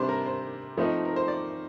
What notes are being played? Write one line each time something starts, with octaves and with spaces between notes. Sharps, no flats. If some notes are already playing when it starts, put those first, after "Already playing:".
Already playing: C3 G3 D4 C5 D5
A#4
C5
F3 A3 C4 D#4
A#4
C5
D5